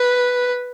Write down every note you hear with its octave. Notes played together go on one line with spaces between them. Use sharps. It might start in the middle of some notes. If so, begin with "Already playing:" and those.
Already playing: B4